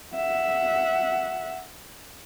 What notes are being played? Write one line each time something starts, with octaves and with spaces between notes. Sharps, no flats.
E5 F#5